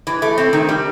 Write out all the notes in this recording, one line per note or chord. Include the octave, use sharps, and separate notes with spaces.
E3
A3
C4
D#3
G3